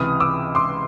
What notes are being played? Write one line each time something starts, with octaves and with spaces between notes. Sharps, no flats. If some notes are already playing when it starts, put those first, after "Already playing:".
Already playing: C#2 C3 E3 D#6 F6
D6 E6
C6 D6